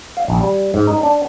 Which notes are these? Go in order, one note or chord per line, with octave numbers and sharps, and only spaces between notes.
F5
A#1
G3
G#2
D#4
D4